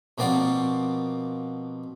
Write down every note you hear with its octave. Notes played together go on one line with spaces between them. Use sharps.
B2 F3 A#3 C4 D5 F#5